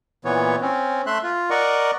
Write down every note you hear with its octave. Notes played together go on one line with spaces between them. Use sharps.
A#2 E3 B3 C#5
C4 C#4
A3 E5 C6 F#6
F4
A#4 D5 D#5 F#5 C#6